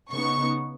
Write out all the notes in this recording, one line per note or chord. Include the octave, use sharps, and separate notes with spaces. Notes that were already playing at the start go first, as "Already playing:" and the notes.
C#3 B3 D#4 C#6